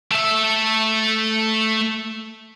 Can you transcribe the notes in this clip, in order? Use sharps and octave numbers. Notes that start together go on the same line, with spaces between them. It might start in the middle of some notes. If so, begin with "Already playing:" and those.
A3 E5